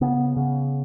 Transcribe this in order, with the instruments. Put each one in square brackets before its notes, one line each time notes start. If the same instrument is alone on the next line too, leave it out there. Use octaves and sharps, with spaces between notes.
[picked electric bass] C#3 B3
C#3